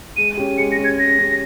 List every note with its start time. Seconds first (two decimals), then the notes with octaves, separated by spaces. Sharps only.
0.17 G#3 D#7
0.37 C#4 G4
0.57 G#3 C#7
0.72 A#6
0.78 C#4 G4
0.84 G#6
0.98 G#3 A#6
1.19 C#4 G4